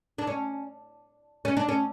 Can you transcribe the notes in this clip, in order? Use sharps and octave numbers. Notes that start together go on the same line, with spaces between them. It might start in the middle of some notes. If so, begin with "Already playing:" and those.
D4
C#4
C#4
D4
C#4